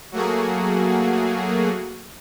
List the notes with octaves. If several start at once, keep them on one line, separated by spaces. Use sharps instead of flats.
F#3 A3 A#3 F#4 G#4